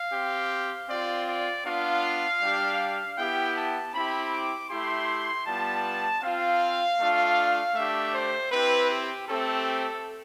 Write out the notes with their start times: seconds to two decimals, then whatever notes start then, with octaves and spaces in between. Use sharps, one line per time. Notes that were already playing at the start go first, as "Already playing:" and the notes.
Already playing: F5
0.13 C4 G4
0.88 C4 F4 D5
1.27 D5
1.65 B3 D4 F4 F5
2.41 G3 D4 G4
3.18 B3 E4 G4 G5
3.56 A5
3.94 C4 E4 G4 B5
4.32 D6
4.70 A3 E4 G4 C6
5.46 G3 B3 F4 A5
6.23 C4 F4 F5
6.99 A3 D4 F4
7.75 A3 D4 G4 E5
8.13 C5
8.51 C4 E4 G4 B4
8.90 G4
9.28 A3 C4 G4 A4